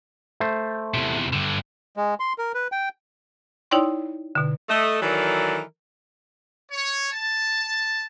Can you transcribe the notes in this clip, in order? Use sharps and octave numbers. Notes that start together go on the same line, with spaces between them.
A3 C5
E2 C3
G2 D3
G#3
C6
A#4
B4
G5
D#4 E4 C#5 D5 G5 C6
B2 D3
A3 D#5
D#3 E3 F#3 A4 A#4 D5
C#5
A5